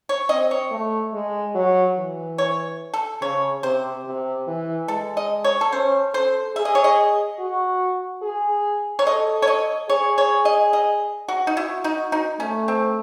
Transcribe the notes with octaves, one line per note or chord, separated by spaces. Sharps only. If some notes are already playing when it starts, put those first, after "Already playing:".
C#5
C4 D#5
C#5
A3
G#3
F#3
E3
C#5
A4
C#3 C#5
C3 C5
C3
E3
G#3 A4
D#5
C#5
A4
C#4 C5
A4 C5
G#4 E5
D#5
C#5
D#5
F#4
G#4
C#5
A4 D#5
C#5
D#5
G#4 C#5
C#5
D#5
D#5
F#4
D#4
E4 F#4
D#4
D#4
A3 C#4
C4